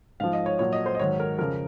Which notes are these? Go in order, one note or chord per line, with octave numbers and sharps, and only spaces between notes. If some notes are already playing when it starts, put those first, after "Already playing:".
G#2 F3 F5
D#5
C#5
A#2 F#3 C#5
D#5
C5
D#5
G#2 D#3 F#3 C#5
A#4
F2 C#3 F3 A#4